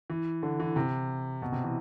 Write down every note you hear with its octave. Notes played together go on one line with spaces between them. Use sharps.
E3
D3
E3
C3
B2
C3
E3